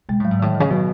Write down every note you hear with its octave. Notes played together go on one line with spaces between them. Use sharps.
B2 G#3
A2 F#3
G#2
A2 D#3
E3
C#3
B2 F#3